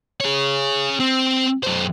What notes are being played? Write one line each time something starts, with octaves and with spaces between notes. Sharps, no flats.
G#4 C#5
C4
F#2 C5